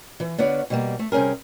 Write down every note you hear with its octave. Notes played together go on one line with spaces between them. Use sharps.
E3
D3 B3 F4 C#5 D5
B2 G3 A#3
A3
C3 G3 C#4 G#4 A#4